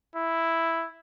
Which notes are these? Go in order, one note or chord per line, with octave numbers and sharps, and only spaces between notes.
E4